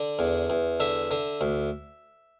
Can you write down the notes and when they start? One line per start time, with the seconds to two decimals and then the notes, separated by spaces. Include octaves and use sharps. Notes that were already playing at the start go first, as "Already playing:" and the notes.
Already playing: D3 D5
0.19 E2
0.50 E2
0.80 D3 E5
1.11 D3
1.41 D2